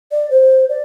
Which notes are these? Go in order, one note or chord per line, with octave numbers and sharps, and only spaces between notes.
D5
C5
D5